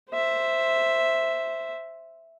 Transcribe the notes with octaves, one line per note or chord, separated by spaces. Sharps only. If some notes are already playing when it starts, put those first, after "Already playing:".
C5 E5